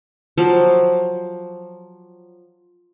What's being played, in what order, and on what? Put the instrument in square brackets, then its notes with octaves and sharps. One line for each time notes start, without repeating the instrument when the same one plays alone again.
[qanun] F3 F#3